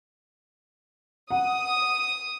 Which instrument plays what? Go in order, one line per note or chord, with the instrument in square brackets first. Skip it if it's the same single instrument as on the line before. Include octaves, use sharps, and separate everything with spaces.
[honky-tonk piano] F#5 [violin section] D#6